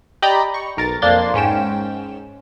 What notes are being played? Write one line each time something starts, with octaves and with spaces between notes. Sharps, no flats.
G4 D5 D#5 G5 A#5 B5
C#6
B1 A#4 A6
F2 A#3 D4 C6 A6
G#2 C#4 G5 E7